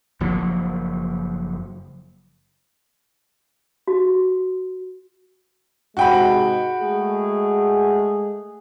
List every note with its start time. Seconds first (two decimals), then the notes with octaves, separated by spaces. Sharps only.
0.20 F#1 F3 F#3 A#3
3.88 F#4
5.97 G#2 C3 G#3 F#4 G5 B5
6.80 G#3 A3 G#4